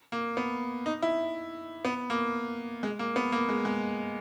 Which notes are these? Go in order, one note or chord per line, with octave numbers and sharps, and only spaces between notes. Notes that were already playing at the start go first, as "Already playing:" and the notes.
A#3
B3
D#4
E4
B3
A#3
G#3
A#3
B3
A#3
G#3
G#3